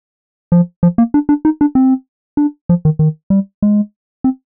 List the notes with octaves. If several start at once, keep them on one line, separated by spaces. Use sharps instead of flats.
F3
F3
A#3
D4
D4
D#4
D4
C4
D4
F3
D#3
D#3
G3
G#3
C4